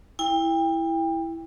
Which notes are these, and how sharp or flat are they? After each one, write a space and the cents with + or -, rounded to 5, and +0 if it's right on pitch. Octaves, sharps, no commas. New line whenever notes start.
E4 +0 G5 +30